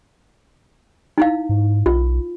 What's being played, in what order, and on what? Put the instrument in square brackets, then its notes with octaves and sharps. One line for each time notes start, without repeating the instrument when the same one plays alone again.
[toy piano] D#4 E4 F5
[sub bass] G#2
[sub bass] B1 [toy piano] F4